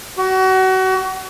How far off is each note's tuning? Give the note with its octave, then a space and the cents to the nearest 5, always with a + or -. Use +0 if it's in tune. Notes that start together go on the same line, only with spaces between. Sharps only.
F#4 +30